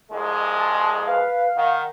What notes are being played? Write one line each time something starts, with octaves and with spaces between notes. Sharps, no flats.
C2 F2 G#3 D#5
A5
B4 F5
D#3 F#5